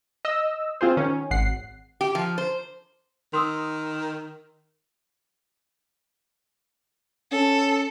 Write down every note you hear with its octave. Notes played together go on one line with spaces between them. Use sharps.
D#5 E6
C4 F4 G#4 C5
D#3 C#4
G#1 F#5 C7
G4
F3
C5
D#3 C6 D#6 E6
C#4 A4